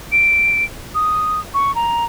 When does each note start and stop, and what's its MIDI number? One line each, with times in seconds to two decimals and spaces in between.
0.12 0.64 98
0.95 1.40 87
1.54 1.74 85
1.75 2.05 82